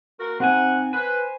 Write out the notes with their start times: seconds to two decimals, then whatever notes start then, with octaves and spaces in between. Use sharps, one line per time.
0.20 A#3 F#4 A#4
0.40 C3 C4 D#4 F#5 G#5
0.93 B4 C5 G#5